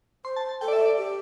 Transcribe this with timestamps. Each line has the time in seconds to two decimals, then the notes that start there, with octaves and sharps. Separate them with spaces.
0.25 C5 C6
0.36 A5
0.49 A5
0.61 A4 G5
0.68 D5
0.73 E5
0.85 D5
0.98 G4